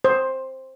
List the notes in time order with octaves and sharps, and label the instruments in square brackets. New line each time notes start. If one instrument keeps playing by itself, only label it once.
[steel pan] C5